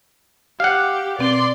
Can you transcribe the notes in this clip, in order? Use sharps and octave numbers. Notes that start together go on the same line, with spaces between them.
G4 F5 F#5
B2 C4 D5 C6